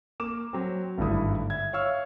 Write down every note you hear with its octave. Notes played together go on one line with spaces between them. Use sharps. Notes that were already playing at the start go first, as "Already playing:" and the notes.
A#3 D6 E7
F#3 C4
G#1 G2 D3 A3 E4 D#6
E5 G#6
C#5 E5 F5 C#6 E6 F6